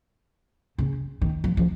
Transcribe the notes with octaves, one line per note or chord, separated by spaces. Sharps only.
C#3
D#3
F3
F3